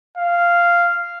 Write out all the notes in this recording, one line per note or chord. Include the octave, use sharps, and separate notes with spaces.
F5